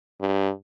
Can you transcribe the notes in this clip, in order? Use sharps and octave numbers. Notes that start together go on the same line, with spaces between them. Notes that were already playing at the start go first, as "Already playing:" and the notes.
G2